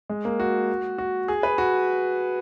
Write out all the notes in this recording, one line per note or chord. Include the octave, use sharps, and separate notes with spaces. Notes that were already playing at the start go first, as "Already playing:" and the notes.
G#3
A#3
F#4
F#4
G#4
B4
F#4